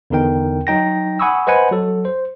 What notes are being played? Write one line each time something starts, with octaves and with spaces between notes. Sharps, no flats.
E2 D3 D#4 A#4 G5
F#3 D#4 G5 A#6
F#5 G#5 B5 C#6 D#6 E6
B4 C5 D#5 F#5 G#5 B5
F#3 A4
C5